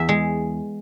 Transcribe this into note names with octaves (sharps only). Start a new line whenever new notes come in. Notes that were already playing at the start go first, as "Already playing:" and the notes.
Already playing: E2 E5
G#3